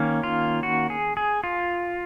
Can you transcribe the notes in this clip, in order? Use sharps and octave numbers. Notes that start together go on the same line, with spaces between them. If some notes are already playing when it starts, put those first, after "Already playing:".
Already playing: D#3 A#3 C#4
F4
F#4
G#4
G#4
F4